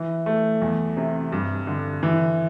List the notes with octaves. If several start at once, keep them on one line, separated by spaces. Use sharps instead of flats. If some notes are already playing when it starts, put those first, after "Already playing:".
Already playing: E3
A3
E2
C3
G2
D3
E3